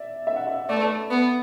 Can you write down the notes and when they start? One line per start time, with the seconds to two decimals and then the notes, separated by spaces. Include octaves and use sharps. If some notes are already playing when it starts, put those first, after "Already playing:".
Already playing: D5 E5
0.27 E5
0.36 F#5
0.47 E5
0.69 A3 D5
0.77 B4
0.83 D5
1.10 B3